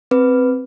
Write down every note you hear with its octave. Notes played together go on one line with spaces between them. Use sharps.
C4 B4